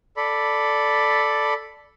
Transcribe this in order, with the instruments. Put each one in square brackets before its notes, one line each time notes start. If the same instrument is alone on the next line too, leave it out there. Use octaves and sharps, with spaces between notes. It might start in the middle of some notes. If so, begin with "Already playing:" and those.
[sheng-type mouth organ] A4 D5 B5